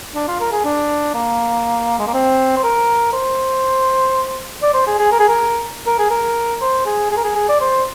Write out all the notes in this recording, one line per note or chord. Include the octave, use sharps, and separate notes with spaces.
D4
F4
A#4
G#4
D4
A#3
G#3
A#3
C4
C5
A#4
C5
D5
C5
G#4
G#4
A#4
G#4
A#4
A#4
G#4
A#4
C5
G#4
G#4
A#4
G#4
G#4
D5
C5